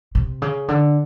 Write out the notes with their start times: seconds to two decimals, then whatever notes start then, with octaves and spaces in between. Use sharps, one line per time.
0.15 C3
0.42 C#3
0.68 D3